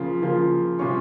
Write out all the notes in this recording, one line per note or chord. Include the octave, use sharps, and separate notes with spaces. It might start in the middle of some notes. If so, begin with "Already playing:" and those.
Already playing: C#3 F3 A#3 F4
C#3 F3 A#3 F4
C3 G3 C#4 F4 C#6